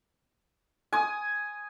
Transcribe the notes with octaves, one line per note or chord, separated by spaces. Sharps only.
G#5 D#6